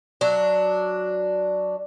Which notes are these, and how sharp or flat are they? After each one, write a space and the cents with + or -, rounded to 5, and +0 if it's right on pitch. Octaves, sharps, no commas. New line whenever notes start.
F#3 +0 D4 +0 E5 -5